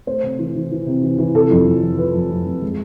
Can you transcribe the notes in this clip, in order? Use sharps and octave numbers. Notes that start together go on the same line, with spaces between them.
A3 C5
C3
E3
E3
E3
C3
E3
E3
C3 A4
F2
F2
F3
F3 B4
F2
F2
F2
G#3